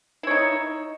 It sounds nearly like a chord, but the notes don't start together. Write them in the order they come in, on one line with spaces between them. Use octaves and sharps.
E4 C#5 D#4